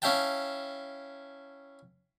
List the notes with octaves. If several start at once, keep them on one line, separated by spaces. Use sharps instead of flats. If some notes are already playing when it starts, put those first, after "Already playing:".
C#4 E4 F5 G5 A5